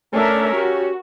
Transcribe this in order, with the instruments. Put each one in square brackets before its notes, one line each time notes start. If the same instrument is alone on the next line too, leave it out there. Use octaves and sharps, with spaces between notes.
[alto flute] A3 [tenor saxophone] C#4 [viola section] D4 A#4 E5
[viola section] F#4 [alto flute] G4